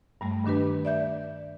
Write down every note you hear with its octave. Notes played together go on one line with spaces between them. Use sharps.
G2 G3 A3
G2 D#3 D4 G4 B4
D5 E5 G6